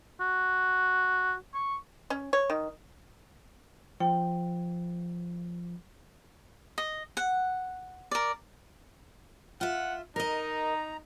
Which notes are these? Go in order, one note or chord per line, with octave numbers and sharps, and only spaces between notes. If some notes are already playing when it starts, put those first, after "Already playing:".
F#4
C#6
C#4
C#5
D#3
F3 G5
D#5
F#5
A#4 D5
F4 E5 F#5
D#4 A#4 D#5 A#5